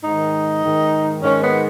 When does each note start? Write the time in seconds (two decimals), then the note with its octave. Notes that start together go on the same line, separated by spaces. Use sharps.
0.03 G#2 D#3 D#4
0.63 G#2 D#3
1.23 G#2 D#3 C#4
1.43 B3